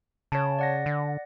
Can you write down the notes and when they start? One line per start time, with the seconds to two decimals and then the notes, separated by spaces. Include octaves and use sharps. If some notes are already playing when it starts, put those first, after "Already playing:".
0.32 C#3 C#5 A5
0.59 D5 F#5 A#6
0.86 D3